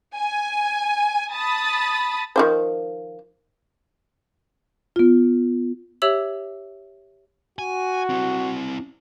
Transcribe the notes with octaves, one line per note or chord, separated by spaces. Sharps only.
G#5
A5 B5 D#6 A6
D#3 F3 C5
B3 F4
G4 C#5 E5 E6 F#7
F#4 G#5
C4 E4